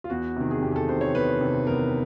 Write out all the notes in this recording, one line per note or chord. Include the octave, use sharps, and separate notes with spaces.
F4
E2 F#4
C3 D#3
G#4
E2 G4
G#4
A4
C3 D#3 C5
C#5
E2 B4
C3 D#3
E2 A#4